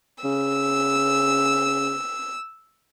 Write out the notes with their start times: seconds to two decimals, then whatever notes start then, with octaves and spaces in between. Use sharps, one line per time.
0.25 C#3 E6